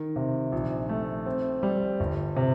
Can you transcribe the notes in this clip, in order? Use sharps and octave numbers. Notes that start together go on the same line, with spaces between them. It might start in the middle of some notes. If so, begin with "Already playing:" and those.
Already playing: D#3
C3
A#1
A3
C4
G3
G1
C3